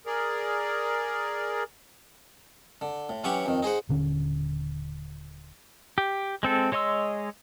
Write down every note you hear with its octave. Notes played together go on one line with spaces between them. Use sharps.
G#4 A#4 D5
D3
A2
E3 F#3 C#4 G4 F#5 C#6
F2 D#3
D#4 G#4 C5 F#5
D#1 D3 C#4
G4
G#3 C4 A4
G#3 C#5 D#5 C6 E6